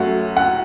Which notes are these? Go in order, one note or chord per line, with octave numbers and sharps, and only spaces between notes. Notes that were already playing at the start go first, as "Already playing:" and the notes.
Already playing: F#2 F#3 A3 F#5
F#5